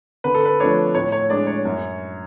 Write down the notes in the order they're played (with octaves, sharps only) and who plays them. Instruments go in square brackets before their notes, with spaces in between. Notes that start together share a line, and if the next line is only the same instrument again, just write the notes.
[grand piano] D3 B4
A4
B4
F3 A3 D4 C#5
A2 C#5
C#5
G#3 D4 D5
C#5
F#2